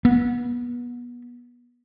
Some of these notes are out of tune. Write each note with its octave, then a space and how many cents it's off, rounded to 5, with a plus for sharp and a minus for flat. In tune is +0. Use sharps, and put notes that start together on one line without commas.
B3 -25